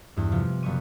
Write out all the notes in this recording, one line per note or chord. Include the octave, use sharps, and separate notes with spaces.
E2 G2
C3 F3 F4
F#1 B3 C#6 D#7